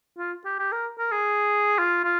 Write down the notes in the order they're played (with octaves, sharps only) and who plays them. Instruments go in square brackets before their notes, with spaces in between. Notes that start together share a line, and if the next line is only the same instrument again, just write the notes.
[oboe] F4
G4
G4
A#4
A#4
G#4
F4
F4